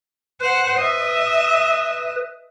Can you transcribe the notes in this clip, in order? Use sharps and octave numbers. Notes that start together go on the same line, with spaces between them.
B4 C5 F#5
D#5 E5